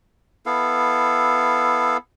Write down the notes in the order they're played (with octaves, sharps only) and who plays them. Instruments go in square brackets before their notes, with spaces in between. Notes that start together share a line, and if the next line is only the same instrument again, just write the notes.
[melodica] B3 E4 A4 F5